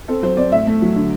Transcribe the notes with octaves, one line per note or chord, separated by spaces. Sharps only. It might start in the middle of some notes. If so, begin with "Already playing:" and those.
C4 A4
F#3 C5
C4 D5
A2 E5
A3
F#3
D3